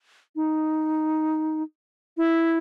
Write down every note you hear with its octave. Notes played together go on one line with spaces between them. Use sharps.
D#4
E4